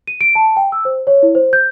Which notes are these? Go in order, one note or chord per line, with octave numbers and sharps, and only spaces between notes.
D#7
D7
A5
G5
E6
C5
C#5
E4
C5
G6